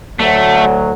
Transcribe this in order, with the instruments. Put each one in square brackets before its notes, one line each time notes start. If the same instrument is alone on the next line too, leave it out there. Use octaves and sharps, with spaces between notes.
[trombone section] D2 F#3 [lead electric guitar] A3